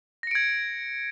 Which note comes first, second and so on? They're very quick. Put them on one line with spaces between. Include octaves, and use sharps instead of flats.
A#6 C#7 D7 G#6